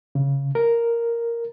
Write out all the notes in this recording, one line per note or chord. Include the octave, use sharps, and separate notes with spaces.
C#3
A#4